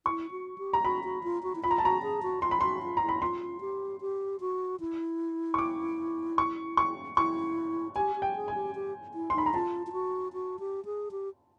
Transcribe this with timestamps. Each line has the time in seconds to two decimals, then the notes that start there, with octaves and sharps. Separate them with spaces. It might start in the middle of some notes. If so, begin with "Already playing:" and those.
0.06 E4 C#6
0.31 F#4
0.58 G4
0.73 A#5
0.84 F#4 B5
1.04 F#4
1.23 F4
1.43 F#4
1.55 E4
1.64 F4 B5
1.71 A#5
1.78 A5
1.83 F#4 A#5
2.03 G#4
2.22 F#4
2.42 F4 C6
2.51 B5
2.61 F#4 C6
2.83 F4
2.97 E4 A#5
3.09 B5
3.22 F4 C6
3.61 G4
4.01 G4
4.40 F#4
4.80 E4
5.54 C#6
5.58 D6
6.38 C#6
6.77 C#6
7.17 E4 C#6
7.96 G4 G#5
8.16 G4
8.22 G5
8.36 G#4
8.48 G#5
8.54 G4
8.75 G4
9.14 E4
9.30 C6
9.34 D#4 B5
9.46 A#5
9.54 F4 A5
9.87 F4
9.93 F#4
10.33 F#4
10.59 G4
10.85 G#4
11.11 G4